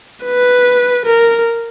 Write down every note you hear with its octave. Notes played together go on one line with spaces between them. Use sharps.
B4
A#4